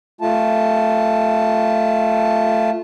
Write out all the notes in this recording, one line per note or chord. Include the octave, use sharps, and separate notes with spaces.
A3 F4 A5